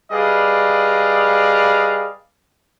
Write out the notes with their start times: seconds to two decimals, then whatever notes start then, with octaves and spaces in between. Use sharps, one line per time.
0.12 G3 G#4 B4 D5 D#5 F5